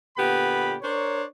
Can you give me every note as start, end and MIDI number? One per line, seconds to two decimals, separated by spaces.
0.17 0.76 46
0.17 0.76 50
0.17 0.76 59
0.17 0.76 67
0.17 0.76 83
0.82 1.23 62
0.82 1.23 70
0.82 1.23 72
0.82 1.23 73